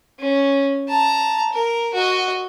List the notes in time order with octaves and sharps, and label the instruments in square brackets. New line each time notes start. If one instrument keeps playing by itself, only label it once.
[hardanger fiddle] C#4
A5 A#5
A#4
F#4 D#5